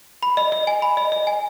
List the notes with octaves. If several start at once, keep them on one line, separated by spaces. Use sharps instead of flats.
B5
D#5
D#5
G#5
B5
D#5
D#5
G#5